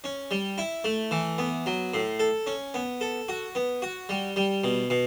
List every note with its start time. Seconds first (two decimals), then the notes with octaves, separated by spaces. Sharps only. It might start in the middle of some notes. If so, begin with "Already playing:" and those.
0.04 C#4
0.31 G3
0.58 E4
0.84 A3
1.11 E3
1.38 B3
1.66 F#3
1.94 A2
2.20 A4
2.47 C#4
2.74 B3
3.01 A4
3.29 F#4
3.55 B3
3.82 F#4
4.09 G3
4.36 G3
4.64 B2
4.90 B2